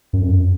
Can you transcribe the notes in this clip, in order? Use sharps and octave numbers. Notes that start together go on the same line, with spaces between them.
F#2
F2
F#2